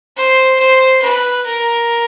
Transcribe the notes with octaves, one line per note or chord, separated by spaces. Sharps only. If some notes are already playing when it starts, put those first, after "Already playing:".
C5
C5
B4
A#4